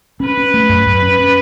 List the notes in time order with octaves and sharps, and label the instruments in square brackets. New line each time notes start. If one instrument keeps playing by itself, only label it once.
[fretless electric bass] C#4 [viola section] B4
[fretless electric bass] C#4
A3
F#2
F#2
C#4
C#4